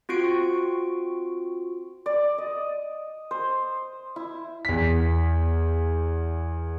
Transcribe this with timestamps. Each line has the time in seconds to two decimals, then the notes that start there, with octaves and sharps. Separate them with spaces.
0.09 C4 F4 F#4 C#6 C7 D7
2.06 D5
2.38 D#5
3.31 C5
4.16 E4
4.65 E2 B6